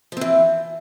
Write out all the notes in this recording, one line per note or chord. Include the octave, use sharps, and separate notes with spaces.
E3 F3 C4